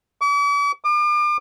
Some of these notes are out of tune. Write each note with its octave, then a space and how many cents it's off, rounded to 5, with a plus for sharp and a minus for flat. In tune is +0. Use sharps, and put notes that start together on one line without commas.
D6 -45
D6 +40